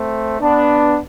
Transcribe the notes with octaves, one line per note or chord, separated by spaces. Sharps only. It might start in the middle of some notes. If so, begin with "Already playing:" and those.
Already playing: A3 C4
B3 D4